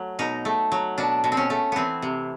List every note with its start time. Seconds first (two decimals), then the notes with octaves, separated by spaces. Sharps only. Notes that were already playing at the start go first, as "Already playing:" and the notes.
Already playing: F#3 A3
0.19 B2 D#4
0.45 A3
0.72 F#3
0.98 B2 D4
1.24 B2
1.32 C4
1.37 C#4
1.50 A3
1.72 E3 B3 C4
2.02 C3